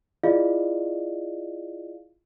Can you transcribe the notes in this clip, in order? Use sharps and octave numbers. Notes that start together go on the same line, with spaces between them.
E4 F4 G#4 D5 D#5 F5